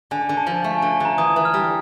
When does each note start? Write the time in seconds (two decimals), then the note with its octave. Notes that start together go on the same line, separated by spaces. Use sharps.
0.11 D3 G#5
0.29 D3
0.37 A5
0.47 F3
0.64 A3
0.78 D3 G#5
1.00 D3 A#5
1.18 E3 D#6
1.36 E3
1.45 F6
1.54 G3